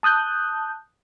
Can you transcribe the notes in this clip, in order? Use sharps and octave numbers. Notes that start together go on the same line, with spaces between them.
A5 D#6 F#6 G6